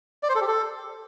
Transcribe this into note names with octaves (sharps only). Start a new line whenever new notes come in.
D5
C5
A4
G4
A4